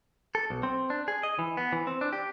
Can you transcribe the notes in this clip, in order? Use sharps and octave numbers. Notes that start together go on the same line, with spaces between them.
A4
B1
C4
D4
G#4
D#5
E3
B3
E3
C4
D4
G4